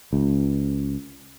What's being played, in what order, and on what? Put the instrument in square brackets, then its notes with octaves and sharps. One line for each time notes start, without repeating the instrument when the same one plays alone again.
[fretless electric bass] C#2